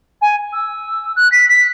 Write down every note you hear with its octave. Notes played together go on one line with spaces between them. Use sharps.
G#5
E6
F#6
B6
B6